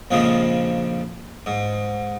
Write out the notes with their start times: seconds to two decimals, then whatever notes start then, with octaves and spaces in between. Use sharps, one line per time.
0.11 A#1 F2 C#3 F3 G#3
1.46 G#2